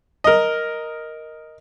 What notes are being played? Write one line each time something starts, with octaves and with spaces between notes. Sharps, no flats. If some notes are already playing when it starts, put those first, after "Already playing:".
A#4 D#5